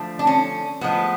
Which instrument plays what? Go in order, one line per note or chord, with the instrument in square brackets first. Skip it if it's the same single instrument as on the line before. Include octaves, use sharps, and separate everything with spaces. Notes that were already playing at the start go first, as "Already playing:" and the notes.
Already playing: [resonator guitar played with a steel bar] D3 F3 A3
D4
C#4
A2 F3 G#3 B3